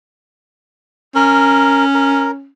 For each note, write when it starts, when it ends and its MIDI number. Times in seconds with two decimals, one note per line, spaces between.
1.15 2.48 61
1.15 1.85 70
1.95 2.31 70